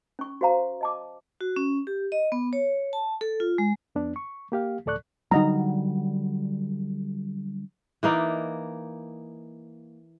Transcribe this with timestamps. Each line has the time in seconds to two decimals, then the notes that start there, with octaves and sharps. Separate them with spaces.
0.19 C#4 C#6
0.41 F#4 C5 F5 A#5
0.81 D#5 A5 D6
1.41 F#4
1.56 C#4
1.87 G4
2.12 D#5
2.32 B3
2.53 C#5
2.93 A5
3.21 A4
3.40 F4
3.58 G#3
3.95 F2 B3 D4
4.16 C#6
4.52 A#3 G4 F5
4.86 D2 A2 A4 D5 C#6 F#6
5.31 D3 F#3 G3 D#4 D#5 A#5
8.03 E3 A#3 D#4 D5